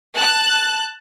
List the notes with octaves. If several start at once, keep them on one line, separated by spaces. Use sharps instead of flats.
A5 F#6